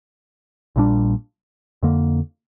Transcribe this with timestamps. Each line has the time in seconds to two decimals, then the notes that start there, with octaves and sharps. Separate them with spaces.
0.76 A#1 A#2 G3 D4
1.83 F2 D3 A#3